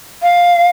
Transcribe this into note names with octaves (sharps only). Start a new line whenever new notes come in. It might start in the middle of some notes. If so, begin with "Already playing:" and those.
F5